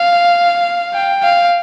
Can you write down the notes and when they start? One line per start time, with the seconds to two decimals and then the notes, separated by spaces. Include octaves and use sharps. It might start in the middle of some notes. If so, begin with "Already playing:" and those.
Already playing: F5
0.94 G5
1.23 F5